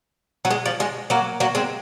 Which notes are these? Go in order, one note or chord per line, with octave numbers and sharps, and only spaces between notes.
F#3
G#3
F3
G#3
F#3 A#3
F#3 A#3
G#3 C4